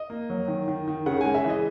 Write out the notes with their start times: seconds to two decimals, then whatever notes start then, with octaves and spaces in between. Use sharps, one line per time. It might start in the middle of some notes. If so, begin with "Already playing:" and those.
Already playing: D#5
0.10 A#3
0.30 F#3
0.48 D#3
0.68 D#3
0.88 D#3
1.06 C#3 F#5
1.21 G#3 G#5
1.35 E5
1.44 E3
1.49 D#5